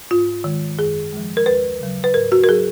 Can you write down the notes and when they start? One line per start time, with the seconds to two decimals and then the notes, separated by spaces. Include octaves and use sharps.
0.11 G#2 F4
0.44 D#3 G#3
0.79 F#2 G#4
1.13 F3 G#3
1.37 A#4
1.46 D#2 B4
1.80 C#3 F#3
2.04 B4
2.14 G#2 A#4
2.32 F#4
2.44 A#4
2.48 F#3 G#4